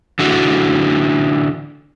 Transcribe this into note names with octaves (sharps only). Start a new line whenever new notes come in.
D3 E3 F#4